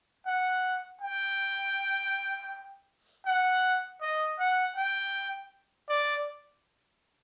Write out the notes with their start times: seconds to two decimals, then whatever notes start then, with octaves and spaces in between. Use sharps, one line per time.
0.27 F#5
1.01 G5
3.26 F#5
4.01 D#5
4.39 F#5
4.76 G5
5.89 D5